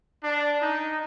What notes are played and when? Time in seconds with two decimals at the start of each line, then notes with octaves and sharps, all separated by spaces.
0.23 D4
0.61 D#4